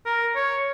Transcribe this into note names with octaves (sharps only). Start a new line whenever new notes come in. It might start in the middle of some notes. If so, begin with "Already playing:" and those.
A#4
C#5